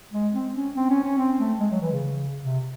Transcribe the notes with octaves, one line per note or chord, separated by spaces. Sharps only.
G#3
C4
C#4
C4
C#4
C#4
C4
A3
G#3
F#3
E3
C#3
C3